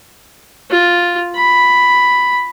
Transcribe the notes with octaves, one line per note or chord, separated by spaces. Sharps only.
F4
B5